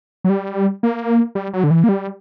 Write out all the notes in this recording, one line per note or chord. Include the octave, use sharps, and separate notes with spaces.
F#3
G3
A#3
G3
F#3
D3
E3
A#3
G3